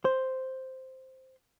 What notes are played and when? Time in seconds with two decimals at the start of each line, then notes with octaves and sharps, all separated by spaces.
0.05 C5